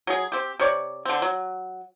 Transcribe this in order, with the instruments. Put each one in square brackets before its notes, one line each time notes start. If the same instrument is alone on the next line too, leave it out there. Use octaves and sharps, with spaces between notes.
[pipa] F#3 G#4
C4 G4
C3 C#5 D5
D3 C4
F#3